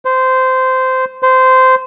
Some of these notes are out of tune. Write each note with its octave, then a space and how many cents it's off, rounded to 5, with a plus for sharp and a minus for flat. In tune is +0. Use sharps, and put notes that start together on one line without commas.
C5 -15
C5 -15